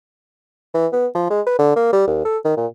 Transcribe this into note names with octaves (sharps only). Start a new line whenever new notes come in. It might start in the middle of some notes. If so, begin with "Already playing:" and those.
E3
B3
F3
G#3
B4
D3
A#3
G3
D#2
A4
D#3
A#2